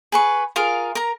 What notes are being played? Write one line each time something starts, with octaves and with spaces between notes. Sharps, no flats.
G#4 B4 C#6
F4 G#4 A#4 F5
A#4 A#5